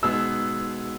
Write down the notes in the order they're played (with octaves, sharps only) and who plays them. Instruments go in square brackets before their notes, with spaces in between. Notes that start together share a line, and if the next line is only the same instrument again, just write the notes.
[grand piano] B2 G#3 B3 D#4 G#4 [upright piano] E6